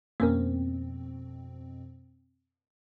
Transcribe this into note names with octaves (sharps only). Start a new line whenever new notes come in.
F2 B2 A#3 C4 C#4 A#4